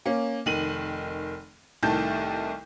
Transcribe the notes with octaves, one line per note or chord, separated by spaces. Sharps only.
A#3 C#4
F1 D#3 D#7 F#7
C2 A2 D#3 A3 A5 G6